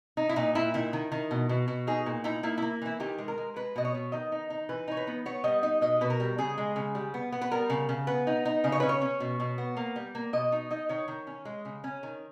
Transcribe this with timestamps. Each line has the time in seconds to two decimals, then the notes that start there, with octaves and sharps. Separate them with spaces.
0.17 D#4
0.29 E4
0.36 A#2 D#4
0.55 A#2 E4
0.74 D#3 E4
0.93 D#3
1.12 D#3
1.31 B2
1.49 B2
1.68 B2
1.87 D#4 G#4
2.06 A#2
2.24 D#4 E4
2.43 A#3 E4
2.58 A#3 E4
2.82 E3 E4
3.00 D#3 G4
3.18 G#3
3.28 A#4
3.38 G#3
3.56 G#3 B4
3.76 B2 D#5
3.85 C#5
3.94 B2
4.12 D#3 D#5
4.32 D#4
4.50 D#4
4.69 E3 B4
4.88 D#4 C#5
4.97 B4
5.07 B3
5.26 B3 C#5
5.44 G3 D#5
5.63 D#4 D#5
5.81 B2 D#5
6.01 B2 B4
6.10 A#4
6.20 G3
6.38 C#3 G#4
6.58 G#3
6.76 C#3
6.95 G3
7.14 B3
7.32 B3
7.42 B4
7.51 G3 A#4
7.70 C#3
7.89 C#3
8.07 B3 B4
8.27 D#4
8.45 D#4
8.64 C#3 D#5
8.72 C#5
8.80 C#4 B4
8.89 C#5
9.02 C#4
9.20 B2
9.40 B2
9.58 B3
9.77 A#3
9.96 G3
10.15 A#3
10.33 B2 D#5
10.52 D#4
10.71 D#4 D#5
10.89 D#3 C#5
11.08 D#3
11.27 C#4
11.45 G#3
11.65 C#3
11.84 C#4
12.03 D#3